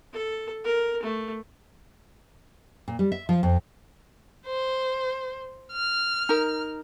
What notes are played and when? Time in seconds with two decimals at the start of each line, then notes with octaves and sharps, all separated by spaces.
0.13 A4
0.64 A#4
1.03 A3
2.88 A#2
2.99 G3
3.12 E5
3.29 F3
3.43 F2
4.46 C5
5.73 F6
6.29 D#4 A#4